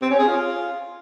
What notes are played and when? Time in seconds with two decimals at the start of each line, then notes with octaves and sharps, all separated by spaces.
0.02 C4
0.10 C#4
0.19 G#4
0.28 F4